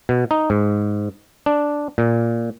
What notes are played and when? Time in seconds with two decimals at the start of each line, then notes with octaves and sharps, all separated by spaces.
0.09 B2
0.31 D#4
0.50 G#2
1.46 D4
1.98 A#2